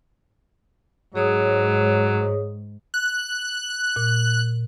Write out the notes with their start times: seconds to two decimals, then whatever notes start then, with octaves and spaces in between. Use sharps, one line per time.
1.15 G#2 F#3 G#4 C#5 D#6
2.94 F#6
3.96 A#2